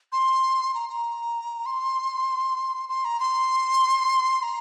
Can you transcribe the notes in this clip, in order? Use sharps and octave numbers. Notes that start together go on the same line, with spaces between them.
C6
A#5
A#5
C6
C6
A#5
C6
A#5